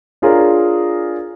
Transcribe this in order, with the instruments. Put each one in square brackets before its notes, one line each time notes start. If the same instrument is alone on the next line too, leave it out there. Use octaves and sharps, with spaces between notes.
[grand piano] D4 F4 G#4 A#4 C#5 D5